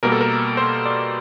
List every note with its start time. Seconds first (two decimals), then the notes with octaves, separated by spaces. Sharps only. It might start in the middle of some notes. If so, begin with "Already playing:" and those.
0.03 B2 G3 A#3 A#4
0.12 A4
0.21 A#4
0.57 C5
0.86 D5